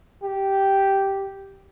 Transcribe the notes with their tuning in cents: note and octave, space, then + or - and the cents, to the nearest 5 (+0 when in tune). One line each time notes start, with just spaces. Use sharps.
G4 -5